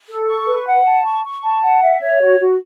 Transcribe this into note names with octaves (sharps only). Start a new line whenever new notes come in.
A4
C#6
B4
F#5
A5
C#6
C#6
A5
F#5
E5
C#5
F#4
F#4